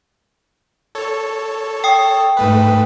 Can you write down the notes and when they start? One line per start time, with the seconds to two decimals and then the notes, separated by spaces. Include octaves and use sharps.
0.95 A4 C#5
1.84 G5 D#6
2.37 G#2 A3 B4